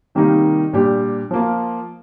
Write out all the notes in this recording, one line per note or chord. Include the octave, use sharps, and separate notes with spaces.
C3 D#3 G3 A#3 D#4
A#2 G3 D4 G4
F3 A#3 F4